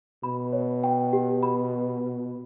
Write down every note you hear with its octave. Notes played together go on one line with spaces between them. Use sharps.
B2 B5
C#5
G5
G4
B5